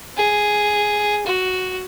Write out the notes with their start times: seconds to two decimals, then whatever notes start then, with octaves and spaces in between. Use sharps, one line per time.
0.17 G#4
1.26 F#4